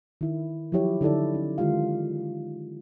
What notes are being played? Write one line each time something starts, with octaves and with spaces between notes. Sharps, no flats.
D#3 E4
F3 F#3 E4 G4 C#5
D3 D#4 E4 A4 D5
C#4
D3 D#3 G#3 F4 G4 F5